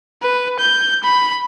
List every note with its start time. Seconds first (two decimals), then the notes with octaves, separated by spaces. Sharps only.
0.22 B4
0.59 G6
1.03 B5